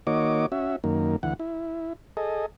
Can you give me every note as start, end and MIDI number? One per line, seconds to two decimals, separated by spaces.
0.07 0.46 51
0.07 0.46 58
0.07 0.46 66
0.07 0.46 73
0.07 0.46 75
0.07 0.46 86
0.52 0.76 61
0.52 0.76 66
0.52 0.76 76
0.84 1.16 42
0.84 1.16 51
0.84 1.16 58
1.23 1.34 38
1.23 1.34 52
1.23 1.34 78
1.40 1.93 64
2.17 2.46 68
2.17 2.46 69
2.17 2.46 75